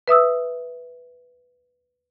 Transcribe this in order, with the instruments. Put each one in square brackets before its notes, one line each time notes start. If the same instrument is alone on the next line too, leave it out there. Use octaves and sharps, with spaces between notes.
[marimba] B4 E5 D#6 E6